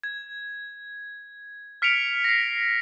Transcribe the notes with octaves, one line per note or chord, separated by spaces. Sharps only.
G#6
F6 B6 C#7 D7 F7
A#6 C7